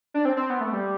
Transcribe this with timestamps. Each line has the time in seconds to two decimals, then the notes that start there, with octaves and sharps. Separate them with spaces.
0.14 D4
0.25 C4
0.37 C4
0.50 B3
0.61 A3
0.73 G3